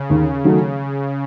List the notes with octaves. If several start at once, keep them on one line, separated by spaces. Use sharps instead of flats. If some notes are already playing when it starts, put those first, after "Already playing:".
Already playing: C#3
D#2
D#3 F#3 A3